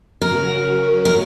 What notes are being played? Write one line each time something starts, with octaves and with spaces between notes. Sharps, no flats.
C#3 F#3 C#4 F#4 A#4
A#4